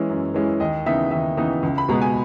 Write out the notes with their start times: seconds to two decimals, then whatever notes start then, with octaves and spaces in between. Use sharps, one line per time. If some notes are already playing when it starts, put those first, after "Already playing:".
Already playing: E3 G#3 C#4 E4
0.09 F#2
0.34 E3 G#3 C#4 E4
0.60 D#2 D#5
0.86 C#3 E3 B3 D#4 E5
1.11 D#2 E5
1.37 C#3 E3 B3 D#4
1.63 C#2
1.78 B5
1.88 B2 G#3 B3 A#5
2.02 G#5